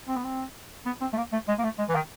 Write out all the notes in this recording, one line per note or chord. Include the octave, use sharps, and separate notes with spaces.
C4
B3
C4
B3
C4
A3
A#3
A3
G#3
A#3
A3
G#3
E3
D#3